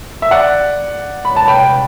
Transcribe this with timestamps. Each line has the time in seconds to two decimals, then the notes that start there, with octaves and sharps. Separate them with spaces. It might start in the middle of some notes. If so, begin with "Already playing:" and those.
0.22 E5
0.31 D5 F#5
1.25 B5
1.36 A5
1.48 G5 B5